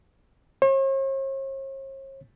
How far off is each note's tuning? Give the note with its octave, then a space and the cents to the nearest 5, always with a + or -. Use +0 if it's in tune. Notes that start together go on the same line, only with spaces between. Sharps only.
C#5 -45